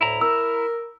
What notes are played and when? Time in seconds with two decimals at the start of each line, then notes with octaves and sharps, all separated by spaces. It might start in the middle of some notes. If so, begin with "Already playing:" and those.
0.01 D2 A2 E4 A#5
0.21 A#4 E6